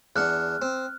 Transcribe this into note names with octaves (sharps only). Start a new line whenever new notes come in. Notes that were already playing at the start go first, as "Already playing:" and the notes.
E2 D4 F#5 F6 F#6
C4